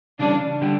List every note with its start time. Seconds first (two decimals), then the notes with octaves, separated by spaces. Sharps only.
0.19 C#3 E3 G3 C#4 D4
0.61 D3 G3 D4 G4